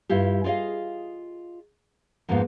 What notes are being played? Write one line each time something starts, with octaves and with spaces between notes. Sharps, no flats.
G2 E4 F4 G4
F4 G#4 D5 D#5 F5
F2 G#2 F3 A#3 B3 F4